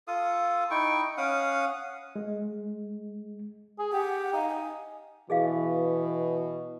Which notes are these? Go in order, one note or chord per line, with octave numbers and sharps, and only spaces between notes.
F4 A4 F5 D#6
D#4 E4 G5 C#6
C#4 F5 F#5 D#6
G#3
G#4
G4 F#5
D#4 F5
G#5
B2 E3 G#4 D#5 F5